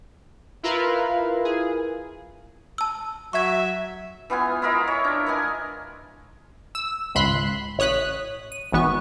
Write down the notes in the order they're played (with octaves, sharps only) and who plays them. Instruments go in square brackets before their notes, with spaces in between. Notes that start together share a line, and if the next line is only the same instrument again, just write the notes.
[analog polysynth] E4 F4 A#4 B4 F5
G#4
[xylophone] A5 E6
[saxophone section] F#3 E5 [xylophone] C#6 G#6
[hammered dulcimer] E3 B3 F4 G#5
E4 F4 A#4 D#5
C#5
D4
A#4 B4 D#5 G#5
[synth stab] E6
G#1 C#2 B5 C6 F#6
A1 C#5 D#6 F#6 B6
D#7
G#1 E3 B3 C#6